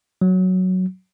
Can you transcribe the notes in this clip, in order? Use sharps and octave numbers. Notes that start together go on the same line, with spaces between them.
F#3